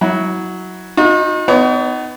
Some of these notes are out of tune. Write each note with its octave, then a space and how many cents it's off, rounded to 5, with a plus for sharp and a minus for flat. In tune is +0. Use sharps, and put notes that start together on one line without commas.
F#3 +0 E4 -25
D#4 +0 F#4 -45
B3 +30 D#4 +0 C#5 +45